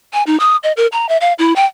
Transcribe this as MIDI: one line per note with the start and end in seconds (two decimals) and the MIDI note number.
0.13 0.23 80
0.27 0.39 63
0.40 0.56 87
0.63 0.72 75
0.77 0.87 70
0.92 1.08 82
1.09 1.17 76
1.21 1.33 77
1.39 1.53 64
1.56 1.65 79